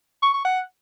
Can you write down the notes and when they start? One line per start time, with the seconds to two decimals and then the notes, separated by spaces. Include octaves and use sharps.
0.23 C#6
0.34 C#6
0.45 F#5